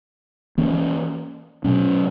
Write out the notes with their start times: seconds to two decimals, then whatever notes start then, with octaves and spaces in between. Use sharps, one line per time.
0.58 E3 A#3 C#4
1.64 B2 F#3 C#4